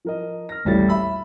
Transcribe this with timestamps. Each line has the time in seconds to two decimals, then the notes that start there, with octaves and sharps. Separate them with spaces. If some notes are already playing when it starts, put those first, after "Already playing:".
0.05 F3 A#4 D#5
0.49 F6 A#6
0.65 D#1 A1 G3 A3 C#5 A6
0.88 E5 B5 E6